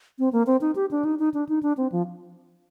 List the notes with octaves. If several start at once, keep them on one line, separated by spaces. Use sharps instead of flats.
C4
A#3
C4
D#4
G4
D4
D#4
D#4
D4
D#4
D4
C4
F3